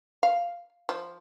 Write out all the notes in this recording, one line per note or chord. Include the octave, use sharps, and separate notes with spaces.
F5
F3